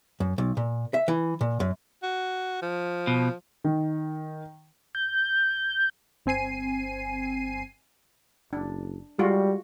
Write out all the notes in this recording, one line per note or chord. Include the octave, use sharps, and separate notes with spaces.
F#2
B1
A#2
E5
E3
A#2
F#2
F#4
F3
B2
D#3
G6
G1 C4 G#5 C7 D#7
F#1 D4
G3 G#3 F4 F#4